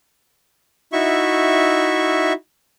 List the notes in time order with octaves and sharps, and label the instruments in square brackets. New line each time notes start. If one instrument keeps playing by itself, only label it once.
[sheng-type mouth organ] D#4 E4 F#4 E5 C#6